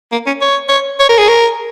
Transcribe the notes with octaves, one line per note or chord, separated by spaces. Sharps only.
A#3
C#4
C#5
C#5
C#5
A#4
G#4
A#4